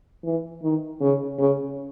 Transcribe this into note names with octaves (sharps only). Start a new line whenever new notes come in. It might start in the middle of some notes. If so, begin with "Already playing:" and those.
E3
D#3
C#3
C#3